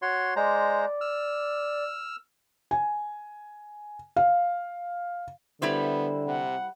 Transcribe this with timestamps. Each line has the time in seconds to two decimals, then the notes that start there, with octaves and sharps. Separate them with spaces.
0.02 F#4 C#5 C6
0.36 G#3 C5 D5 A#5
1.01 E6 F6
2.71 G#5
4.16 F5
5.62 D3 G3 B3 E4 C5
6.25 C3 F#5